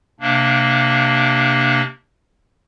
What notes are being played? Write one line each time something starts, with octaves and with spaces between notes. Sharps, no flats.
C3 A#3 D4